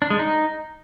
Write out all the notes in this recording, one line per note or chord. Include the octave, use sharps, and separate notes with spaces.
D4
G#3
D#4